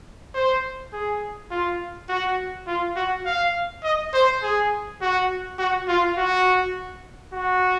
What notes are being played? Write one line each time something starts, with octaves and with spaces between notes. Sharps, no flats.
C5
G#4
F4
F#4
F4
F#4
F5
D#5
C5
G#4
F#4
F#4
F4
F#4
F#4